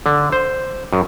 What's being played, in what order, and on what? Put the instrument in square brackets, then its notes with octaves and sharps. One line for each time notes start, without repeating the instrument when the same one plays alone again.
[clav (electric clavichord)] D3
C5
F#2